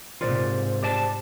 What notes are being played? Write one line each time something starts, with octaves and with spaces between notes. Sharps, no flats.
G#2 C3 F4 A#4 C5 D5
G4 D5 A5